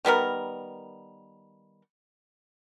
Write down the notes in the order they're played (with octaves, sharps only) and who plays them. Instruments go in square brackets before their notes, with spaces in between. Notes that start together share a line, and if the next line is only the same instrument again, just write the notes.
[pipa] D#3 G3 B3 A#4